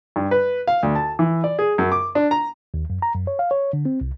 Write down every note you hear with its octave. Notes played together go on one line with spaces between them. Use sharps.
G2
B4
F5
D2
A5
E3
D5
G#4
F#2
D6
D4
A#5
D#2
F#2
A#5
F#2
C#5
F5
C#5
D3
C4
C2